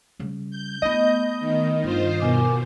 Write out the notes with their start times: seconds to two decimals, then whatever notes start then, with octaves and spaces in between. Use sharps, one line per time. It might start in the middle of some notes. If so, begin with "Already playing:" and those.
0.19 C#3 G3
0.51 G6
0.82 A3 B3 E4 F4 D#5
1.40 D#3
1.84 G2 F4 C5
2.20 B2 A#4 G#5 D6